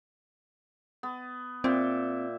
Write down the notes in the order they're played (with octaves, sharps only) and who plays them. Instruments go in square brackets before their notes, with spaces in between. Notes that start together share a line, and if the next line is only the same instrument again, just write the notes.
[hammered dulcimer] B3
[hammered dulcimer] A#2 E5 G5 [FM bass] C4